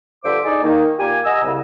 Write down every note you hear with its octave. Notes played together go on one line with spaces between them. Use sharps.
G2 D3 F3 C5 E5 D6
D#4 G#4 D5
D#3 A#3 D#4
A#2 A#3 G4 G#5
D#5 F#5 G#5 A#5 E6
C2 C#3